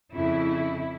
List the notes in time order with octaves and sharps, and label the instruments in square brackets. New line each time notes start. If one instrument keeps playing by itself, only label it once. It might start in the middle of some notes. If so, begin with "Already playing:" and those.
[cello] F2 C#3 [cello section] E4